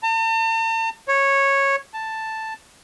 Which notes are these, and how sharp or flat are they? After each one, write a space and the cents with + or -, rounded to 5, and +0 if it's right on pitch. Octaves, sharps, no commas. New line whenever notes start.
A5 +45
C#5 -10
A5 +5